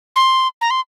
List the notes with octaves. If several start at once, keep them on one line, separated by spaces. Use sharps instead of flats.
C6
A#5
C6